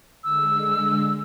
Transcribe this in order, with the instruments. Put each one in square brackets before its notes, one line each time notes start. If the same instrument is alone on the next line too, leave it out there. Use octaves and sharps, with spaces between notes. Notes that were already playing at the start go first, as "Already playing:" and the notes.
[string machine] D3 G#3 [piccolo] E6